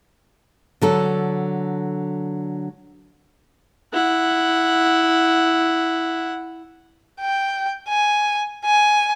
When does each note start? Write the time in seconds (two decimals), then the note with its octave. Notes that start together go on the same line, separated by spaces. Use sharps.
0.82 D3 F#3 A4
3.93 E4 F#5
7.20 G5
7.88 G#5
8.65 G#5